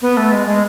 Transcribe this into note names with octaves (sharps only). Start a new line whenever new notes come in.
B3
A3
G#3
G#3